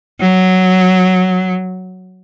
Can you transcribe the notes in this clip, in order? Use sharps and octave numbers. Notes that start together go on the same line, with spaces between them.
F#3